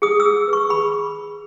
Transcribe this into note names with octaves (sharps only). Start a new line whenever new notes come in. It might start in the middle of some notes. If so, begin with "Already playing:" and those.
G#4 D#6
E6
G#4
B4
C#6
G#4 B5